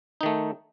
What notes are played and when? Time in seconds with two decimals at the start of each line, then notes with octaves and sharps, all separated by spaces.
0.21 D#4
0.23 D#3
0.26 A3